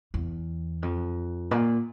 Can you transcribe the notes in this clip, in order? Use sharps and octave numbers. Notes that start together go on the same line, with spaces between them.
E2
F2
A#2